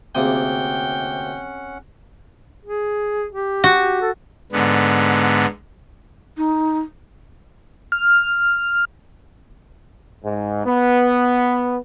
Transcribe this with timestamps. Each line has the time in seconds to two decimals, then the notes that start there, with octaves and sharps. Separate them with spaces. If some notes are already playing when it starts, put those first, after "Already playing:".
0.15 D2 C3 A#3 C4 C#4 G#4 F#5 G5
2.65 G#4
3.32 G4
3.64 F#4
4.01 A4
4.52 G#2 D3 B3
6.37 D#4
7.92 F6
10.23 G#2
10.66 B3